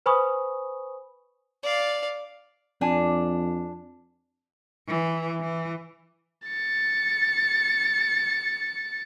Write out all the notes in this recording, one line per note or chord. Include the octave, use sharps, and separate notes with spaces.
B4 C5 G#5 B5 C#6 D#6
D5 F5
F2 D4 G#5
E3
E3
A6 C#7